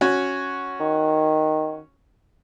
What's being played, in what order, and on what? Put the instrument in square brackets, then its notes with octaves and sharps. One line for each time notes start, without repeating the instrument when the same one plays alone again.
[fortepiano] C#4 F#4 C#5
[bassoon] D#3